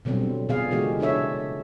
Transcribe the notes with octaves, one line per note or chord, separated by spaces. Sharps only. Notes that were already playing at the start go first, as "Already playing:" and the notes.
B2 D3 F#3 G3 C4
A#2 D3 B3 G#4 D5 F5
C#3 E3 G#3 A#3 F#4 G4
C#3 D4 A4 C#5 E5